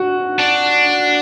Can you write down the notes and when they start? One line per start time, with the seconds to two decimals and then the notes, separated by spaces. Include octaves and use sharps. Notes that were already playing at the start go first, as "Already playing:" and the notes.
Already playing: F#4
0.40 D4